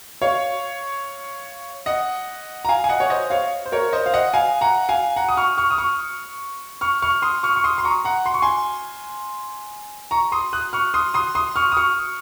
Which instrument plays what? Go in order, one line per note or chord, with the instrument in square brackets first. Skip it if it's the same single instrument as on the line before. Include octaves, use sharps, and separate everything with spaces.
[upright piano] C#5 F5
D#5 F#5
A#5
F5 G#5
G#5
D#5 F#5
C#5
C5 D#5
C#5 F5
C5
A#4 C#5
C5 D#5
F5
D#5 F#5
F5 G#5
F#5 A#5
F5 G#5
F#5 A#5
D#6
C#6 F6
C#6 F6
D#6
C#6 F6
C#6 F6
C#6 F6
C6 D#6
C#6 F6
C#6
C6 D#6
C6
A#5 C#6
F#5 A#5
C6
C#6
G#5 C6
A#5 C#6
C6 D#6
D#6 F#6
C#6 F6
C6 D#6
C6 D#6
C6 D#6
C#6 F6
D#6
C#6 F6